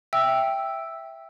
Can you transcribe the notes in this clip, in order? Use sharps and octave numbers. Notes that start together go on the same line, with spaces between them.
E5 G5 E6